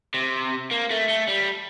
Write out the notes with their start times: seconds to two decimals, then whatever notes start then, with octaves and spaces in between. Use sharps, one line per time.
0.14 C3
0.71 A#3
0.91 A3
1.09 A3
1.29 G3